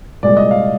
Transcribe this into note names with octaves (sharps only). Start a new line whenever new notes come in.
C2 A#2 G#3 D5
D#5
F5